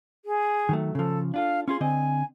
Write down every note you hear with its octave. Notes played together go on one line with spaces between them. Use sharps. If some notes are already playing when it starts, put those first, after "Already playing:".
G#4
D#3 F#3 A3
C#3 F3 A4
D4 F4 A4 F5
C#4 F4 G#4 C6
D3 C4 D#5 G#5